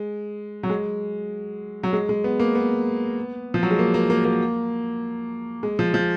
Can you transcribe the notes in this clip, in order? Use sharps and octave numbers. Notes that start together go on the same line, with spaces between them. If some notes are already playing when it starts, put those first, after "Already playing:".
Already playing: G#3
F#3
G#3
F#3
G#3
G#3
B3
A#3
B3
F3
F#3
G#3
A#3
A#3
A#3
A#3
G#3
F3
F3